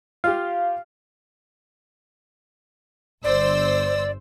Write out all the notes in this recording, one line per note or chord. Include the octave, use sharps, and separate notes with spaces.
F4 G4 F5
G1 C5 D5 E6